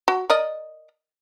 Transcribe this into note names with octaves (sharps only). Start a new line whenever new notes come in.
F#4
A#4 D5 D#5